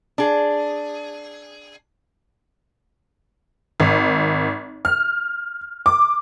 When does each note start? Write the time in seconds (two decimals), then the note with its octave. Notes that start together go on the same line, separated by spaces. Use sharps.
0.18 D4 G#4
3.80 G#1
4.85 F6
5.86 D6